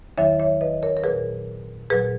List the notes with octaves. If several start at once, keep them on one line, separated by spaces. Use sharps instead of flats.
E2 D#3 F#3 C#5 E5
C#5 E5
B4 D#5
A#4 C#5
A#4
A#2 F#3 G#4 B4
A#2 F#3 G#4 B4